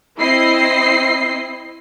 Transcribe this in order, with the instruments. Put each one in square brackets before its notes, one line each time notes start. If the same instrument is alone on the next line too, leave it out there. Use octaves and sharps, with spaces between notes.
[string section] C4 E4 D#5 C7